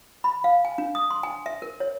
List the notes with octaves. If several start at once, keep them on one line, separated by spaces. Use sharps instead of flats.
B5
F5
G#5
D4
D#6
C6
G#5
E5
A#4
C#5